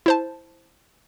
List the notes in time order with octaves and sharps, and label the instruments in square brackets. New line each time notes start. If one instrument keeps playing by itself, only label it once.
[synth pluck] E4 C5 A5